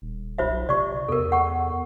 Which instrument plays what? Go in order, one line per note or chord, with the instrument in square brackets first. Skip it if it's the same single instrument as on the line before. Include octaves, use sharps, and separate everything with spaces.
[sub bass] D#1
[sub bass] B1 [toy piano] F4 C5 E5
[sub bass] C3 [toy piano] D5 C#6
[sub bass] E2 [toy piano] A4 A#4
[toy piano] F#5 C#6